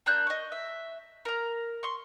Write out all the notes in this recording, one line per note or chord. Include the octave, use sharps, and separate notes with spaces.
A#3 D4 F#6 G6
D#5 C#6
E5
A#4 A#5
C6 C#6